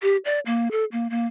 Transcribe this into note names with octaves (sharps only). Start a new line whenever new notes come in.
G4
D5
A#3
A4
A#3
A#3